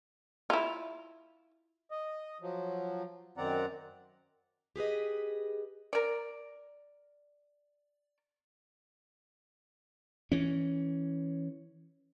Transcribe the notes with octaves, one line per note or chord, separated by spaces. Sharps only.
E4 F4
D#5
F3 F#3
F#2 D#3 C4 D5 F#5 A#5
G4 G#4 B4 D#5
A#4 D5
E3 C#4